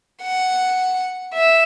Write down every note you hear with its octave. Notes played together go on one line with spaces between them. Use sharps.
F#5
E5